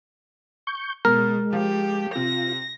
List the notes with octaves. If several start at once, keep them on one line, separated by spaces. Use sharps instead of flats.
C#6 G6
B2 G#3 A#4
F3 G4
C3 F4 A#6